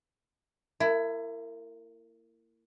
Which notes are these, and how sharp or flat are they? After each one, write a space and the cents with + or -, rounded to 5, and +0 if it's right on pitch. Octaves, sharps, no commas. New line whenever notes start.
A#3 -30 E4 +20